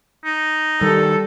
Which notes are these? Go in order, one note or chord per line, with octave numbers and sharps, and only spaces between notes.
D#4
D#3 G3 A4